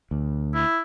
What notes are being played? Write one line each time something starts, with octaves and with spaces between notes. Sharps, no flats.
D2
E4